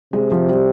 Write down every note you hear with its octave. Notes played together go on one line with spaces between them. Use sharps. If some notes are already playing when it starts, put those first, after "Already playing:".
C3 G#3
F3
G3